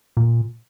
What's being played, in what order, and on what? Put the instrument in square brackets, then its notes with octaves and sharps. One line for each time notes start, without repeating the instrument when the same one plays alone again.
[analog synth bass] A#2